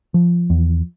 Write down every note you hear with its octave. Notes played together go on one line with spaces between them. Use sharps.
F3
E2